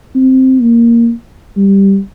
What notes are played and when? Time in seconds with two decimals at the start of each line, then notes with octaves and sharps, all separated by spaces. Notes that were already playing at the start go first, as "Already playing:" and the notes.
0.15 C4
0.62 A#3
1.57 G3